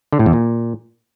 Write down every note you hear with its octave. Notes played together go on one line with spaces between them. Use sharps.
D3
A2
E2
A#2